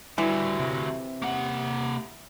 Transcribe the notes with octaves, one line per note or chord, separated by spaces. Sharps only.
D3 E3 F#3 G3
C3
A#3 F#5